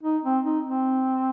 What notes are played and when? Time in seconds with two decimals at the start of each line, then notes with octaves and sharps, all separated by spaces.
0.03 D#4
0.24 C4
0.44 D#4
0.66 C4